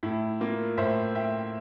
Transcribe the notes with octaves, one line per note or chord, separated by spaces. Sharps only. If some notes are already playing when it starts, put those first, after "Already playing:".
A2 E4
A#3 F4
A2 C5 E5
A2 E5 G5